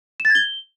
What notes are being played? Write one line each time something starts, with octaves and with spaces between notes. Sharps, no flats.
E7
A6
G#6
G7